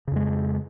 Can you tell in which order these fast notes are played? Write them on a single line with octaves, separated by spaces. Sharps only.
C#3 F2 G#3